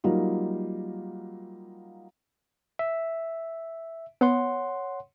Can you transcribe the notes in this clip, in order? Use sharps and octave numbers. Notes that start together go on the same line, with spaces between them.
F#3 G3 A#3 D#4 F4
E5
B3 C#5 F#5 C6